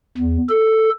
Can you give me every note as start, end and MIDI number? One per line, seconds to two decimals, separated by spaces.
0.18 0.37 40
0.50 0.90 69